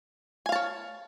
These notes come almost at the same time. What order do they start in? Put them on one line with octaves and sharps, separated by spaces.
G#5 F5 A5 C#5